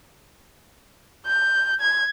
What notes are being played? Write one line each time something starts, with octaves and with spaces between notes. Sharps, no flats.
G6
G#6